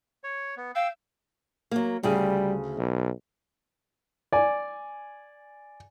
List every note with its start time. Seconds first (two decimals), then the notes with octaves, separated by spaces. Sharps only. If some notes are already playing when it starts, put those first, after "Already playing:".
0.24 C#5
0.57 B3
0.75 F5 G5 E6
1.71 F#3 A#3
2.03 D2 C#3 G3 G#4
2.78 B1
4.33 D5 G#5